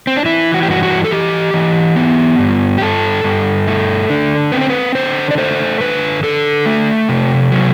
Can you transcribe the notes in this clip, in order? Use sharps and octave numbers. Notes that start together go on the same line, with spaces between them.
C4
D4
E3 E4
F#4
G4
G2 F#4
F#4
A4
E3 G4
E3
B3
G2
G4
G2 A4
G2
A3
D3
C4 B4
C5
B4
D3 C5
D5
A3 C5
D3 B4
D3 A4
A3
C3
F#3